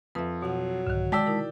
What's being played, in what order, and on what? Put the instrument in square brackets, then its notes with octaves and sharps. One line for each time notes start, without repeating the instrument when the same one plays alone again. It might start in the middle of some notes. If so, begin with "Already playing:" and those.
[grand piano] F2 [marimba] B4 E5
[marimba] B2 F#5 [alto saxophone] F#3
[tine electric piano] C2 G#2 [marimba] D3 D#3
[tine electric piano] G#3 A5 B6 [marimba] F#4 [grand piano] D5 G5 E6
[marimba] D#4 E4 A#4